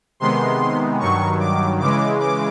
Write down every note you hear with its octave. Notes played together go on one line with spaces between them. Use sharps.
C3 D#3 G#3 B3 C6
G2 D#3 F#3 C#6
D6
C#3 E3 G#3 D6
D6